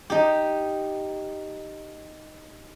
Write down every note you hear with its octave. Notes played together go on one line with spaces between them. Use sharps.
D#4 G4